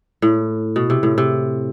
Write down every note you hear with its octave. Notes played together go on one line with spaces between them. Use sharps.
A2
B2
C3
A2
C3